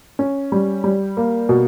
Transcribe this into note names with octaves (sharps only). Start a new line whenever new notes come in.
C#4
G3
G3
A#3
B2